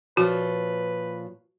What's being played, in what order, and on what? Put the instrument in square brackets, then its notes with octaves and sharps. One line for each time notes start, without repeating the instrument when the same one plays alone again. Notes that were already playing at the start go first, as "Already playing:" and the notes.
[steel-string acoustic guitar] A#2 F3 C#5 [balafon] F#4 [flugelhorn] B4